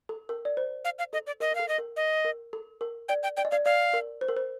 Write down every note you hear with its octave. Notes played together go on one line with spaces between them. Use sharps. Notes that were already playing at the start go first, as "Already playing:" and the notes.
A4
A#4
D5
C5
F5
F5
A4 D#5
D5
A#4 D#5
A#4
A4 F5
D#5
A#4
D#5
A#4
A4
A#4
D5 G5
G5
D5 G5
D#5
D5 F5
D5 F5
A#4
C5
A#4
C5